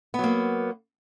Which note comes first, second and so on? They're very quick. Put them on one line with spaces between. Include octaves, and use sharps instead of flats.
B3 F#3 A#3